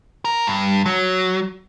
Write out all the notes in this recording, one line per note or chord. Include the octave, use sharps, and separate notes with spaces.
A#4
G2
F#3